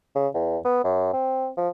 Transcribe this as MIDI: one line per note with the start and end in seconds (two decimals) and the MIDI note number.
0.15 0.28 49
0.34 0.58 40
0.65 0.81 59
0.84 1.11 42
1.13 1.49 60
1.57 1.69 53